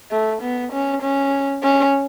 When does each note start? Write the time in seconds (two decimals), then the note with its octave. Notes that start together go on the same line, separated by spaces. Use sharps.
0.11 A3
0.42 B3
0.72 C#4
1.02 C#4
1.63 C#4